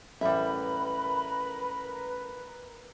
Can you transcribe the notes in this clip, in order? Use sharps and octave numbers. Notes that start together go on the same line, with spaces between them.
A1 G3 A#4 B4 E5 A#5 B5